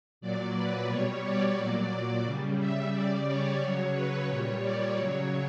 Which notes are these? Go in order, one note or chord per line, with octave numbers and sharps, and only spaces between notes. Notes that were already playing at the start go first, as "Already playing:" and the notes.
A#2 F#3 D5
B4
B2 G3 C#5
D5
A#2 F#3
C#3 G3
E5
C#3 G3 D5
C#5
C#3 F#3 C#5
B4
A#2 G3 C#5
D5
C#3 F#3 C#5